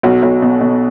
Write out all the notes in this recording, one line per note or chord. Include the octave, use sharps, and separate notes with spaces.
B1 F#4
B1
B2
B2